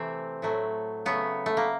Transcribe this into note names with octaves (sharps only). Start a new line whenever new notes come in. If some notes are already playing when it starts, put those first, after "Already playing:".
Already playing: C3 E3 A3 C4
A2 F#3 A3
C#3 F#3 A3 B3
A3
A#3